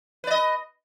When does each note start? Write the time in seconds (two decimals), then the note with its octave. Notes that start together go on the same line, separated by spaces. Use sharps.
0.24 B4
0.27 D5
0.31 D#5